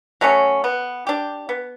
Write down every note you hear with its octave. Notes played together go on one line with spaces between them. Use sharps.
F#3 A3 C#4
B3
D4 G4
B3